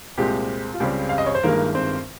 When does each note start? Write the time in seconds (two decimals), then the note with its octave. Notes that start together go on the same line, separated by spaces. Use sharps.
0.18 C2 A#2 G#3 C4 G4
0.74 F4
0.80 C#2 C#3 G3 C4 G4
1.09 F5
1.18 D#5
1.26 C#5
1.35 C5
1.43 G1 G2 D#3 G#3 A#3 A#4
1.75 C4 C5